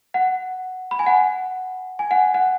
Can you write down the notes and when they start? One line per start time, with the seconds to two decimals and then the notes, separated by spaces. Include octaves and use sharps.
0.14 F#5
0.91 B5
0.99 G#5
1.06 F#5
1.99 G#5
2.11 F#5
2.34 F#5